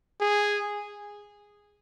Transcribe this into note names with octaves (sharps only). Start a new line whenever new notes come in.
G#4